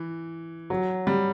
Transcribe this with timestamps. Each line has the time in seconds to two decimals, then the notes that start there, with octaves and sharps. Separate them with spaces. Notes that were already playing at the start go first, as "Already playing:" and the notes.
Already playing: E3
0.70 F#3
1.07 G3